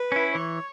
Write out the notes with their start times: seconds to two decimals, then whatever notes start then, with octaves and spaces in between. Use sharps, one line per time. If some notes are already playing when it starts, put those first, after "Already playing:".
Already playing: B4
0.12 C#4 E4
0.35 E3 C#5